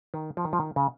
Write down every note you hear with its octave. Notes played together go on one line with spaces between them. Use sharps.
D#3
F3
D#3
F3
D#3
C#3